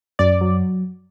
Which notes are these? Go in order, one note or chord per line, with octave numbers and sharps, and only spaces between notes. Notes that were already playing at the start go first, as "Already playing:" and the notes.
F#2 D5
F#3